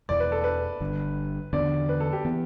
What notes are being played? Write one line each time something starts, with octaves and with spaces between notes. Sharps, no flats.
E1 E2 E3 D5
B4
A4
B4
G1 G2 D3
E2 D3 B3 D4 D5
B4
A4
G4
E3 B3